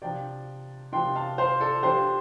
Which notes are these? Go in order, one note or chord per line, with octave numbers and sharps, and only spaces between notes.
C3 F3 D4 D5 G5
C3 F3 D4 G5 C6
F5 A5
C5 F5
A4 D5
F3 D4 G4 C5